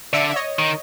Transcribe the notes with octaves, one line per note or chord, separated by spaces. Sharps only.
D3 D5 E5
E5
C#5 D#5
D#3